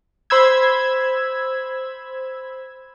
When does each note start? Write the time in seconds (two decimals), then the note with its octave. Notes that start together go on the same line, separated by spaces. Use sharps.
0.30 C5 B5 E6 G#6